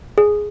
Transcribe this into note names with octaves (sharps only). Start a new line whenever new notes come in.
G#4